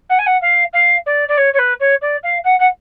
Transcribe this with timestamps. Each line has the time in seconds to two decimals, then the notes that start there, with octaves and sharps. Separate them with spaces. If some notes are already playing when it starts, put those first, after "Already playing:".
0.09 F#5
0.19 G#5
0.26 F#5
0.41 F5
0.73 F5
1.06 D5
1.28 D5
1.37 C#5
1.53 C#5
1.59 B4
1.80 C#5
2.02 D5
2.23 F5
2.44 F#5
2.59 F#5